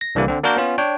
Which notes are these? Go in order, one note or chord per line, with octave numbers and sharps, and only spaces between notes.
A#6
C2 D3 E3 G3 A#3
D3 C4
A#3 D4 F#4 A#4 G6
B3 C#4 F4
D4 C#5 G5